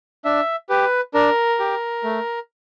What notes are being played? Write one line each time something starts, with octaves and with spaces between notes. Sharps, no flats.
D4 E5
G4 B4
D4 A#4
G4
A3